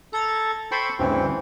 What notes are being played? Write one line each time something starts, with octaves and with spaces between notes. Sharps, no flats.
A4 A#5 G#6 A6
A4 C5 G5 B5 C#6
D2 G2 C#3 E3 C4